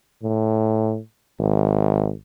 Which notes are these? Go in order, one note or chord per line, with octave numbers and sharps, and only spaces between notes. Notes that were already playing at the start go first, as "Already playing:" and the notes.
A2
G#1